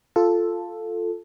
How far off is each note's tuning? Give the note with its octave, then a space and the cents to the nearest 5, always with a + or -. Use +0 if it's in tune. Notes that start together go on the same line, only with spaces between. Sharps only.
F4 +0 A4 +0